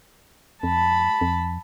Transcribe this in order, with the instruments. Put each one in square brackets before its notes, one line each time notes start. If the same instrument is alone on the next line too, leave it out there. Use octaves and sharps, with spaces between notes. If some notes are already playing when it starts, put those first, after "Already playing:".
[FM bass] F2 [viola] A5 B5
[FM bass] F2